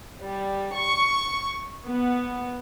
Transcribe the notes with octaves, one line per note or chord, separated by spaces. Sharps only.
G3
C#6
B3